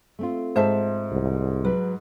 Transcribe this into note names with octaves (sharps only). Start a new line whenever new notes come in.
A3 C4 F4
G#2 C5 E5 A5
C2
F#3 B4